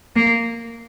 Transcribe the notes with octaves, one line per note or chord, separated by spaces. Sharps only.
A#3